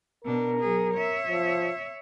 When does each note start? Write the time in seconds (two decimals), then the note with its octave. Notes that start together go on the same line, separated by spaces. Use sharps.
0.24 B2 D4 A#4
0.60 F#3 G#4
0.94 C#5 E5
1.27 F3